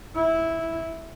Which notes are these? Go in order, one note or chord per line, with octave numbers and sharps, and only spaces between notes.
E4